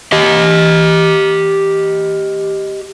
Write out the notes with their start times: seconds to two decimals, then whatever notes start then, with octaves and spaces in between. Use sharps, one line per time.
0.12 G4 D#5